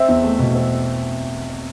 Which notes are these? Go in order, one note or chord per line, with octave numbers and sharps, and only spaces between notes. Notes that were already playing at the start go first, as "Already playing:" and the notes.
Already playing: C4 E5
E2
A3
B2
C4